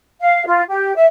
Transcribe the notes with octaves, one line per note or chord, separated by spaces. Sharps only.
F5
F4
G4
E5